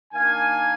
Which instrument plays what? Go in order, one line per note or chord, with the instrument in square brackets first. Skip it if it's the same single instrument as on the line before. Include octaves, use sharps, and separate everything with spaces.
[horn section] D#3 A#3 D4 F5 G#5